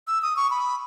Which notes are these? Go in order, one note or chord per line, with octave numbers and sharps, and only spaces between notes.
E6
D#6
C#6
B5